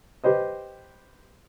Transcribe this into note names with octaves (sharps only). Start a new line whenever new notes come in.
G4 B4 C5 D#5